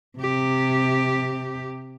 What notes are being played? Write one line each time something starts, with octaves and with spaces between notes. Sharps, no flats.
C3 G4